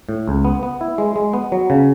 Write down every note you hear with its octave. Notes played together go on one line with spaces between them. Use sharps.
A2
C#2
B3
B3
E4
G#3
G#3
B3
F#3
C#3